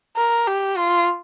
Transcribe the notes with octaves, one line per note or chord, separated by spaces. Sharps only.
A#4
G4
F4